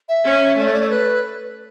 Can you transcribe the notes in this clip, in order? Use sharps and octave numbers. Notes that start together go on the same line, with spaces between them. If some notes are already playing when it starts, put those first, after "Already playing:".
E5
C#4
A3 D5
C#5
D5
C#5
B4